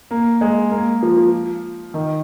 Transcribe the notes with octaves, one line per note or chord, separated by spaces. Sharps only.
A#3
G#3
A#3
F3
F3
D#3